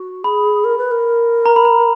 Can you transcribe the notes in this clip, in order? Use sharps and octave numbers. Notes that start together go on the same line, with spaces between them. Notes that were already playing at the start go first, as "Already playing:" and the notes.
Already playing: F#4
G#4 B5
A#4
B4
A#4
A#5
B5
A#5